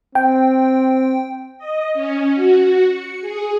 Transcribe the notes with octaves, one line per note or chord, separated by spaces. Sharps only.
C4 G5
D#5
C#4
F#4
C#7
G#4